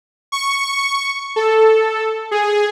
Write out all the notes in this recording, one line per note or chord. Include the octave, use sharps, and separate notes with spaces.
C#6
A4
G#4